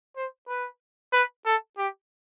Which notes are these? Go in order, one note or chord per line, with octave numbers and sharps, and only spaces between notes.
C5
B4
B4
A4
G4